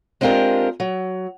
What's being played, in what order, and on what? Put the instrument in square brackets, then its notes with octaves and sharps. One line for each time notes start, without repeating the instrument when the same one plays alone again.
[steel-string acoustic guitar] G#3 C4 D4 F4 G4 A#4
F#3